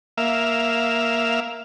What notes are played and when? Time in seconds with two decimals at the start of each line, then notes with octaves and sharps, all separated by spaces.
0.18 A#3 E5 F5